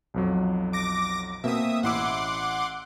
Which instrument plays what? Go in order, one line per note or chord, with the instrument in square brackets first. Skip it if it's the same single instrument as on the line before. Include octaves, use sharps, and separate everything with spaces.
[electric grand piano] B1 F2 F#3
[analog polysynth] D6 A#6
[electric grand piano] B2 A#3 C4 [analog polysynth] E5 D#6
[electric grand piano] A1 E4 E6 [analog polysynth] F#5 C6 D6